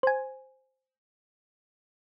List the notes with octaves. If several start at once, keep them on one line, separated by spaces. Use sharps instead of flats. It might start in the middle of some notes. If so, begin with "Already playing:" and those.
C5 G#5